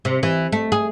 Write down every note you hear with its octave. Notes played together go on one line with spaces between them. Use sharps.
C3
E3
A3
G#4